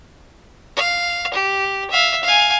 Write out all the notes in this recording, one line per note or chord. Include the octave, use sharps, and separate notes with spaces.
F5
G4
E5 F5
F5 G#5